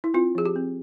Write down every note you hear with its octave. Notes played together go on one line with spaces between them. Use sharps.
E4
C4 F4
F3 G#4
G4
C4